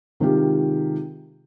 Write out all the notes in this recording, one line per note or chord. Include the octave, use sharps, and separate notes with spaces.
C3 D#3 G#3 F4 G4